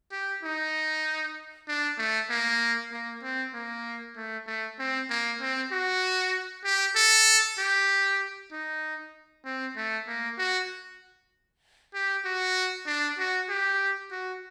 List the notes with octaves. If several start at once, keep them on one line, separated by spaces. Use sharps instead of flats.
G4
D#4
D4
A3
A#3
A#3
C4
A#3
A3
A3
C4
A#3
C4
F#4
G4
A4
G4
D#4
C4
A3
A#3
F#4
G4
F#4
D4
F#4
G4
F#4